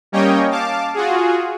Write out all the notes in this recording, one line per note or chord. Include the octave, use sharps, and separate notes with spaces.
G3 A#3 C#4 C#5 D#5 G5
F5 A5 D6
F4 F#4 G#4